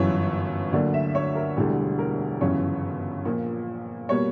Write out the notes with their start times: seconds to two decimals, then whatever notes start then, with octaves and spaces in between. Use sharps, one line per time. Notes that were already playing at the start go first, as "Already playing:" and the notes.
Already playing: G1 F#2 E3 C#5
0.72 D2 D3 F#3 A#3 D5
0.94 E5
1.15 C#5
1.35 A#4
1.57 E1 D2 D3 G3 G4
1.99 A#4
2.41 G1 F#2 C#3 E3 C#5
3.25 A#1 A#2 A#3
4.09 B2 G3 A#3 C#5